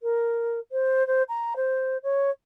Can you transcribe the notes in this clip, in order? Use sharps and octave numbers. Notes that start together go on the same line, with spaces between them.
A#4
C5
C5
A#5
C5
C#5